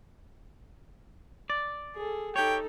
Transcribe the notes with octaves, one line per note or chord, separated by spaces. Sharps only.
D5
G#4 A4
D#4 G4 A4 C#5 G5